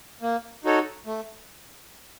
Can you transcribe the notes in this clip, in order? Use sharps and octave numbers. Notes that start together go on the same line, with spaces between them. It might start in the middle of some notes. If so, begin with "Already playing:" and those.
A#3
D#4 F#4 A4 C#5
A3